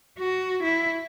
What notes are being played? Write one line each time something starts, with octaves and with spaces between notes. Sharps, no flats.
F#4
E4